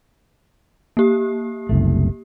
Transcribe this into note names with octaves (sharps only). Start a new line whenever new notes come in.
A#3 G4
F#1 C2 A3